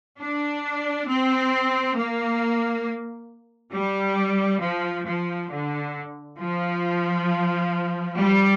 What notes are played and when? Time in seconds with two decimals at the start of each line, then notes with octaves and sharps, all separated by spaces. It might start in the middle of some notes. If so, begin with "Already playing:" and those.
0.19 D4
1.08 C4
1.96 A#3
3.73 G3
4.62 F3
5.06 F3
5.51 D3
6.39 F3
8.17 G3